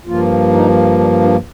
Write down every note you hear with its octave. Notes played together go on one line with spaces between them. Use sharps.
G2 F3 A#3 F4
D#4
D4
D4